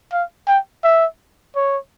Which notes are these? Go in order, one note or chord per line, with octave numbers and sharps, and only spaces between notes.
F5
G5
E5
C#5